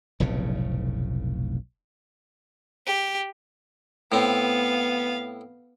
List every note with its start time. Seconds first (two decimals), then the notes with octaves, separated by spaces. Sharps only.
0.20 F1 B1 A2 C#3
2.87 G4
4.12 A2 B3 C4 F5